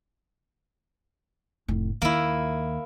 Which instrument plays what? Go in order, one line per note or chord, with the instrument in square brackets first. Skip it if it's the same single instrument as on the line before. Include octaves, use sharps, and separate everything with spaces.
[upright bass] F1 A2
[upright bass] D#2 [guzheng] A#3 E4